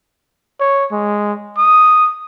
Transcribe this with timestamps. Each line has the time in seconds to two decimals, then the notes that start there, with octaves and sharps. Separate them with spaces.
0.60 C#5
0.92 G#3
1.58 D#6